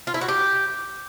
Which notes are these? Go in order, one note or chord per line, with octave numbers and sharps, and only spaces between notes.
F4
E4
F#4
G4